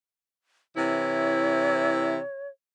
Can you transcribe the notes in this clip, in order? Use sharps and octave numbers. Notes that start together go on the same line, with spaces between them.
C3 E3 E4 C#5